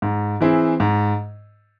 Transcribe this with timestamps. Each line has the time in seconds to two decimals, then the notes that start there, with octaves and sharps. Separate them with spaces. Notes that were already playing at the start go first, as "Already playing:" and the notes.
0.02 G#2
0.40 E3 C4 E4 G#4
0.80 G#2